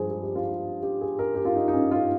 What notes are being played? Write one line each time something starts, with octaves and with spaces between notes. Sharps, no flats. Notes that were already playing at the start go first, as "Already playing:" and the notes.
Already playing: G2 F3 G#3 G#4 C5
G#4
G4
F4
G4
G4
G#4
A#4
G4
F4
D#4
D#4
C#4
F4